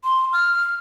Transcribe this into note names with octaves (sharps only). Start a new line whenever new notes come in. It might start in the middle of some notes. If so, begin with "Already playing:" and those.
C6
F6